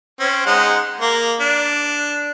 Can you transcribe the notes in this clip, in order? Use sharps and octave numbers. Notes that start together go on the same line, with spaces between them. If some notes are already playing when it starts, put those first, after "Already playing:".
C4 C#4
G#3 D#4 F#5
A#3
D4